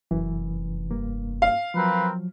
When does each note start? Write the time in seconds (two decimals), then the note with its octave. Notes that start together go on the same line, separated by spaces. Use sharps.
0.11 F1 F#2 E3
0.91 G2 A#3
1.42 F5
1.74 F3 F#3 C4 A#4 B4